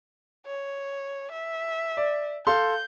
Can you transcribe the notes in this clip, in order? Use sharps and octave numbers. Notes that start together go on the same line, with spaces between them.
C#5
E5
D5
A4 F5 C6 G6